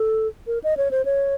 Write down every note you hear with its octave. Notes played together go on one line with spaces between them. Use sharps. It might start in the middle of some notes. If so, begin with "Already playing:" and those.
Already playing: A4
A#4
D#5
C#5
C5
C#5